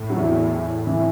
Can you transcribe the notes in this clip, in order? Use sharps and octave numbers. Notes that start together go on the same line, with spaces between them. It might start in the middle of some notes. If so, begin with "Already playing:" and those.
Already playing: A2
F#3
E2 E3
E3